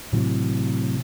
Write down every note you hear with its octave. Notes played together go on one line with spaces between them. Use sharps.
A2 C3 E3 F#3